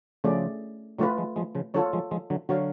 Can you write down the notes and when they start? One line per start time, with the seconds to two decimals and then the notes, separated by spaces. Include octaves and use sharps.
0.24 C#3 F3 A3 C#4 G#4 D5
0.98 D3 F#3 A3 F4 B4
1.18 F3 G#3
1.36 F3 G#3
1.55 C#3 F3
1.74 D3 F#3 F4 A4 C#5
1.93 F3 G#3
2.11 F3 G#3
2.30 D3 F#3
2.49 D3 F#3 F#4 C#5 F5